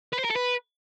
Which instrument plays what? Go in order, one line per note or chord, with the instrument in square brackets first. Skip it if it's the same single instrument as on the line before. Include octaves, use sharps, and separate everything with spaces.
[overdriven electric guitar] B4
C5
A#4
A4
B4